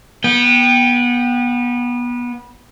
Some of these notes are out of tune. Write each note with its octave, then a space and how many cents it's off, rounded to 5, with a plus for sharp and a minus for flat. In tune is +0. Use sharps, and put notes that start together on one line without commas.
B3 -25 G5 +0